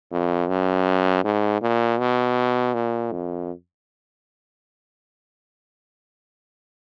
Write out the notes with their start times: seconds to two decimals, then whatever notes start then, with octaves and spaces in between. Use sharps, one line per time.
0.12 F2
0.49 F#2
1.25 G#2
1.61 A#2
1.99 B2
2.74 A#2
3.12 F2